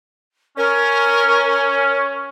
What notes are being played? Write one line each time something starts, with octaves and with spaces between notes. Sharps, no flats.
C#4 A#4